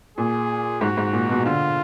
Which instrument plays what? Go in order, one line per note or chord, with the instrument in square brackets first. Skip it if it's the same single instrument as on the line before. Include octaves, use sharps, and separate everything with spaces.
[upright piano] A#2 [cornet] G#4
[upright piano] G#2 [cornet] F#4
[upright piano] G#2
A#2
B2
[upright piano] D3 [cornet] F4